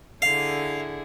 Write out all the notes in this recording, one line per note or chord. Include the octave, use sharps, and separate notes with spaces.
D3 E4 G#4 F5